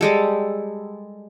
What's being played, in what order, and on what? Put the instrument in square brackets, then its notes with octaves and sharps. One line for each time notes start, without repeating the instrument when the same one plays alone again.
[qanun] G3 G#3 A4